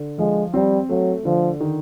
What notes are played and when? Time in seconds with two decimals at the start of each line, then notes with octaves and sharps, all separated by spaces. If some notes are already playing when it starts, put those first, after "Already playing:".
Already playing: D3
0.19 F3 G#3
0.54 G3 C4
0.89 F#3 A3
1.25 D3 F3
1.60 D#3